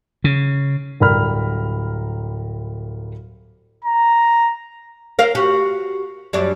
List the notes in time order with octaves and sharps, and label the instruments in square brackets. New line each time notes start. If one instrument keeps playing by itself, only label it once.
[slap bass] C#3
[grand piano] D1 G3 A#4 B5 F6
[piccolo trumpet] A#5
[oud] A#4 C5 F5
F#4 G4
F#2 G3 D4